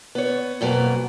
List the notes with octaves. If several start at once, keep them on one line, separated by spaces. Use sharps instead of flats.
B3 C#5
F2 B2 F#3 A#3 B3